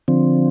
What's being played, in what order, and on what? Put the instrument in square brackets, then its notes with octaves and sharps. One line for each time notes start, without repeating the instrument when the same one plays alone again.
[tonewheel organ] D3 F3 C4